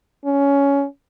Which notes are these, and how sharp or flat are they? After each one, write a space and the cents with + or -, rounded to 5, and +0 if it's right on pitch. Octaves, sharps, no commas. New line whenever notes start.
C#4 +15